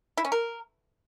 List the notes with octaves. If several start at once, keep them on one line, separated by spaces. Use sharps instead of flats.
E4
C#4
A#4